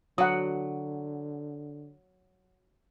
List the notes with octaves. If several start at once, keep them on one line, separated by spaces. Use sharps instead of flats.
D3 F#3 F#5 D#6